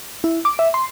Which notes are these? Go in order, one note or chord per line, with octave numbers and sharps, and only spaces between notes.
E4
D6
E5
C6